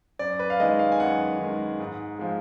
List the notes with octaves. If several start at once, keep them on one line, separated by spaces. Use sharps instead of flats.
F#2 D5
B4
F5
D#3 G#3 D#5
F5
G#5
F#2 F#5
D#3
G#3
G#2
F3 G#3